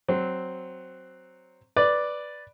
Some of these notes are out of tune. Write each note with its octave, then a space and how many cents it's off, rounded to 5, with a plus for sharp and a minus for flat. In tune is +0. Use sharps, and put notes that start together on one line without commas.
F#3 +10 C4 +0
B4 +0 D5 +0